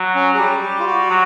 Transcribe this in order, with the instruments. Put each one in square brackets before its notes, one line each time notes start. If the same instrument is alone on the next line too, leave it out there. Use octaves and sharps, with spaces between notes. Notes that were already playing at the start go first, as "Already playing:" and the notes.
Already playing: [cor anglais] F#3
[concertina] C#4
G#4
[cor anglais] G3 [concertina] G4
[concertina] G4
F4
F#4
[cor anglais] F#3